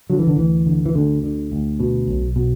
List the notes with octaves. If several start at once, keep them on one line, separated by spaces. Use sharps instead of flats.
D3 F#3
E3
D3
D2 E3
D3
E3
D2 D3
D3
D2
B2
B1
B2